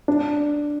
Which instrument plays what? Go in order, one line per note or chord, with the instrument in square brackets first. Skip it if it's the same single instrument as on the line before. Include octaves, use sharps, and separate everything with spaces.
[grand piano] D4